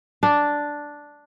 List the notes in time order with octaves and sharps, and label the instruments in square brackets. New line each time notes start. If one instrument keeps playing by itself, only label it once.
[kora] D4